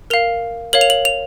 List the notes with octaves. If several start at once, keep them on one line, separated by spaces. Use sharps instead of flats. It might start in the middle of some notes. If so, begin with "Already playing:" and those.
A#4 F5 F7
A#4 C#5 F5 F#7
F7
F#7
F7